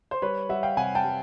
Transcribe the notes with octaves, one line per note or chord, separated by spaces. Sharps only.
C5
G3 B4 C#5
G3 E5 F#5
F5 G5
C3 F#5 G#5
G5 A5
G3